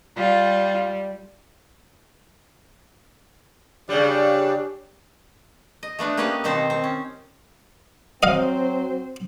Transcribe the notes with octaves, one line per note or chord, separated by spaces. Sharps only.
G3 F4
C#3 G3 D4
D#5
A3 B3 D4 B4
A#3 B3 C#4 G4 B4 D#5
B2 D#3 C4 D#4 C5 A5
C4
C#4
F#3 C4 C5 D#5 F5